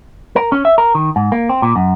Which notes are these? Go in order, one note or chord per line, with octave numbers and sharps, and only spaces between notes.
A#4
C#4
E5
A#4
D#3
G#2
A#3
C4
A#2
F#2